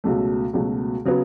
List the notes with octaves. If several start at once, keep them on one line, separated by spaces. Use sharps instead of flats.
C#2 B2 F#3 A3
C#2 B2 F#3 A3
C#3 F#3 B3